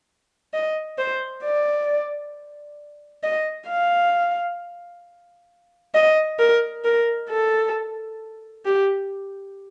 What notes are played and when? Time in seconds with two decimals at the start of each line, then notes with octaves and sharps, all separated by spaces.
0.54 D#5
0.98 C5
1.44 D5
3.23 D#5
3.68 F5
5.95 D#5
6.39 A#4
6.85 A#4
7.30 A4
8.65 G4